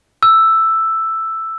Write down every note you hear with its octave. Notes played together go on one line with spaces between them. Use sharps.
E6